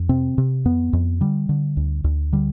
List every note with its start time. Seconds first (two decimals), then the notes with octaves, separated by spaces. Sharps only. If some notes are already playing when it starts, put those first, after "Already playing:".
Already playing: F2
0.09 C3 C4
0.38 C3
0.65 F2 B3
0.93 F2
1.21 D3 G3
1.49 D3
1.77 D2
2.04 D2
2.33 D3 G3